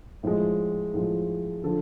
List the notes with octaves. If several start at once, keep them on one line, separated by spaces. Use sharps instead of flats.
A2 F3 G#3
A2 F3 G#3
D3 F3 A4